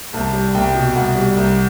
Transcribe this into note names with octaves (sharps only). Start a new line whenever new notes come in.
C2 A5
G3
C2 G5
B2
C2 F#5
G3
C2